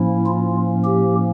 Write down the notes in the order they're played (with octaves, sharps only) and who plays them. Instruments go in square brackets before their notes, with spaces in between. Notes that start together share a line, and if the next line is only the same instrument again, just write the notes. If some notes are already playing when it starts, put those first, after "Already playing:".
Already playing: [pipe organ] A2 F3 A#3 C#4 E4
F4
G4